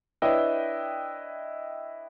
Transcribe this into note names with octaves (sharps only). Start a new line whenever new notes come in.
D4 E4 B4 C#5 D#5 G5